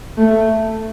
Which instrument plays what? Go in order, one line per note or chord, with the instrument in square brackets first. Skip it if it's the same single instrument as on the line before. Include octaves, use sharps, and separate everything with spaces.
[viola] A3